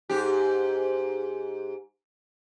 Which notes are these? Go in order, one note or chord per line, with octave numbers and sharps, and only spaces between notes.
G#2 G4